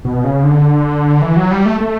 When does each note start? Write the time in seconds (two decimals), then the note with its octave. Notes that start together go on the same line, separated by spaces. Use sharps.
0.05 B2
0.24 C#3
0.43 D3
1.22 E3
1.36 F#3
1.51 G3
1.66 A3
1.81 A3